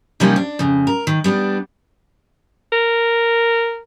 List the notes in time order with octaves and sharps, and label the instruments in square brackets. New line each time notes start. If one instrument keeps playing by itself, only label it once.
[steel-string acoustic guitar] C3 F3 G3 A#3 C#4 D#4
D4
F2 C#3
A#4
D#3
G3 B3 D4
[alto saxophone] A#4